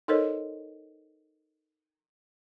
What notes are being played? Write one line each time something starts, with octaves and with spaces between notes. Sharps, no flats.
D#4 A4 A#4 C5 C#5 D#5